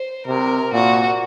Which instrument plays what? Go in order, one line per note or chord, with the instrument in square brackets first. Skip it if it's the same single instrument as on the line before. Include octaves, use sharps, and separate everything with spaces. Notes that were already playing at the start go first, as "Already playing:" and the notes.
Already playing: [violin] C5
[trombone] C3 [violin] A#4
[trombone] A#2 [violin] F#4